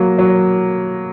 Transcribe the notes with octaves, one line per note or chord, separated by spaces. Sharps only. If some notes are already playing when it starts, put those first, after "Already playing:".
Already playing: F#3 A#3
F#3